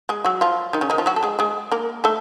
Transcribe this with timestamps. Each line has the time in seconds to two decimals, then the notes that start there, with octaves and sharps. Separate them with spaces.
0.09 G#3 G#4
0.25 F#3 F#4
0.41 F3 F4
0.73 D#3 D#4
0.81 C#3 C#4
0.90 D#3 D#4
0.98 F3 F4
1.06 F#3 F#4
1.16 A4
1.23 G#3 G#4
1.39 G#3 G#4
1.72 A#3 A#4
2.04 A3 A4